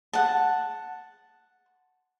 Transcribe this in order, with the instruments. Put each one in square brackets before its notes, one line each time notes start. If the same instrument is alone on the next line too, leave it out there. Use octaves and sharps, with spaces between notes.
[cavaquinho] F#5 A5